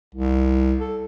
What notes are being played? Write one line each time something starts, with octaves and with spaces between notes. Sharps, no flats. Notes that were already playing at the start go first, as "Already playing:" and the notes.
C2
A4